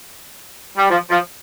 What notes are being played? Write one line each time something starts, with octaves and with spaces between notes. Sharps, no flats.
G3
F3
F3